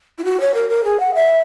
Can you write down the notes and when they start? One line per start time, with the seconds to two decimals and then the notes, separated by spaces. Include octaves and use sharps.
0.18 E4
0.25 F#4
0.41 C#5
0.54 A#4
0.70 A#4
0.84 G#4
1.00 F#5
1.15 E5